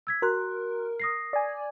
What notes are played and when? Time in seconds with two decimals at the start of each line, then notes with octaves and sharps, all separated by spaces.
0.07 E6 G#6 B6
0.22 F#4 A#4 C6 F#6
1.00 D#6 A#6 C7
1.33 D5 G#5